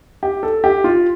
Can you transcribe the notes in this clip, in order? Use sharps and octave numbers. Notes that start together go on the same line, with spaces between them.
G4
A4
G4
F4